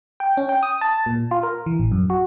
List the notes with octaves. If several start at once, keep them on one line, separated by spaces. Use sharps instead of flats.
G5
C#4
G5
D#6
A5
A#2
F4
A#4
E3
A1
F#2
F#4